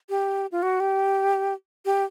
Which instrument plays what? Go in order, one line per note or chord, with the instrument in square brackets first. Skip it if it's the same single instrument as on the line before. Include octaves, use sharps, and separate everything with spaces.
[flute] G4
F4
F#4
G4
G4